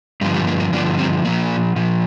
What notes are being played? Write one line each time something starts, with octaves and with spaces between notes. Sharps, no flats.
G2 D3 F3 G3
G3
A#3
A#3
G2 D3 F3 A#3 D4
G3 C4
A#2 F3 A#3
A#2 F3